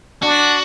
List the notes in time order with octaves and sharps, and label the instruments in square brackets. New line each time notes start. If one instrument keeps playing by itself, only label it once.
[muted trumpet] D4 [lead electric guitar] F#4